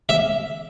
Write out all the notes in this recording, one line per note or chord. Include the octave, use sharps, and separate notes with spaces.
E5